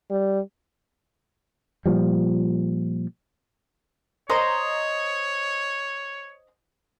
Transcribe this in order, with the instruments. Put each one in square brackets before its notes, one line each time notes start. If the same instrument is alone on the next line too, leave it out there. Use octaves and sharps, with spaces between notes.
[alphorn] G3
[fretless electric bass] A#2 F3 G3
[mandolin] C5 D#5 A#5 [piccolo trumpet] C#5